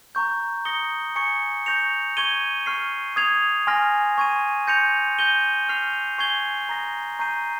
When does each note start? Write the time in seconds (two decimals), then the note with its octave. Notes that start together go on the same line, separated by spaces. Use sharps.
0.15 A#5 C#6 G6
0.65 D#6 A#6 C#7 G7
1.16 G#5 C#6 G#6 C#7
1.66 C#6 G6 A#6 C#7 F7
2.17 C#6 G#6 D#7 G7
2.66 C#6 F6 C7
3.16 D#6 G#6 C7 F7
3.67 G#5 C6 F6 A#6
4.18 C#6 G#6 D#7
4.67 C6 G6 A#6 C#7 F7
5.19 G6 A#6 D#7 G7
5.69 C#6 F6 C7 F7
6.18 G#5 C#6 G#6 C7 G7
6.69 A#5 D#6 A#6
7.19 A#5 C#6 G6 C7 D#7